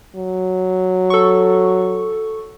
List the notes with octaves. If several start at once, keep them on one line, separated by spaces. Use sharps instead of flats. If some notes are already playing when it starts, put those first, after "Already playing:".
F#3
A4 C#6